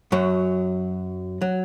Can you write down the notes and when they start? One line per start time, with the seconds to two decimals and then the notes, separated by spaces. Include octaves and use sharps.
0.12 F#2 F#3
1.42 F#3